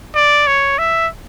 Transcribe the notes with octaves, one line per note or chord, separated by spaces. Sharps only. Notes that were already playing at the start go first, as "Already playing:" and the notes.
D5
C#5
E5